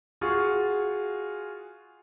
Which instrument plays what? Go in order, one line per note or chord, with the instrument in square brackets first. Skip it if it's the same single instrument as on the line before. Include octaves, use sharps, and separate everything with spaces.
[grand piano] F4 F#4 G#4 C#6